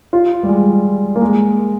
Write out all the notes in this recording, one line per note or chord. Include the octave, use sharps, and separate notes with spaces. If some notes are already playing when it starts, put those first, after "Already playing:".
F4
G3
G#3
A#3
G#3